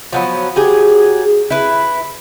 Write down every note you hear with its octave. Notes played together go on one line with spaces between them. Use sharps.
F3 F#3 B3
F#3 G4 G#4
E4 B4